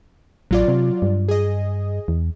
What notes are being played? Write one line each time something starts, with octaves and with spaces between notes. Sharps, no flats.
A1 F#3 F4 D5
C3
G2
G#4 D#5
E2